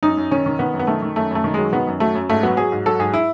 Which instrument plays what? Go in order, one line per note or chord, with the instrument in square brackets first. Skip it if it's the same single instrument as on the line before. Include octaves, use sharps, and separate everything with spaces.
[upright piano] F#2 D#4
F#2
D#3 C#4
D#3
D#3 B3
F#2
B3
D#3 A3
D#3
F#2 A3
F#2 A3
D#3
F#3 G#3
D#3 B3
F#2
F#3 A3
F#2
G#2 A3
F#3 B3
F#3 G#4
G#2
F#3 A4
G#2 G#4
E4